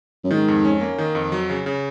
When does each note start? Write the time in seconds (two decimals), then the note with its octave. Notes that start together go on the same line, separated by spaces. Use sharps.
0.24 F#2
0.31 G#2 D#3
0.48 F2
0.65 C#4
0.81 A#3
0.98 D#3
1.15 F2
1.32 F#3
1.49 C#3
1.66 C#3